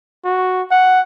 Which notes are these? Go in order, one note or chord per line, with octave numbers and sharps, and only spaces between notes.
F#4
F#5